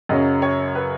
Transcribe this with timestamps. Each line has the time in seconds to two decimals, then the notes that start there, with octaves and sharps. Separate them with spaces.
0.09 F#2 C#3 F#3 C#4 D#5
0.42 C#5
0.75 B4